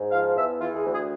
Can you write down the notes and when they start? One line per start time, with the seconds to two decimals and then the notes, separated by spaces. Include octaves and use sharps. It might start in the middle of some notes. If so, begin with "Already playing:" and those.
Already playing: G#2
0.11 F3 F5
0.36 E2 E5
0.60 E3 F4
0.75 G#4
0.85 D2
0.92 G#4